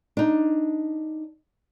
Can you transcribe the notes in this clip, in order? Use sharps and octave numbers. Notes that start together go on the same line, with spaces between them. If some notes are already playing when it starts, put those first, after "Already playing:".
D4 D#4